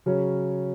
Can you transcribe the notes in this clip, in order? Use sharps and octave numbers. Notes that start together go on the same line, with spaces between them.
C#3 F#3 C#4